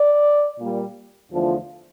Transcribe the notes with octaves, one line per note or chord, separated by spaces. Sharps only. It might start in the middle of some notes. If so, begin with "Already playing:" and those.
Already playing: D5
A#2 G3 A#3
E2 D3 F3 A3